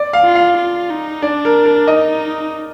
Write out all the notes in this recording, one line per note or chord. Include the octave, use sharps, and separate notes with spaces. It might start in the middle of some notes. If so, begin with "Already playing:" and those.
Already playing: D5
F5
F4
F5
F4
D#4
D4 D5
A#4
A#4
D#4 D#5